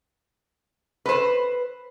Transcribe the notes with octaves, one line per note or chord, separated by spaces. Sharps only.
B4 C5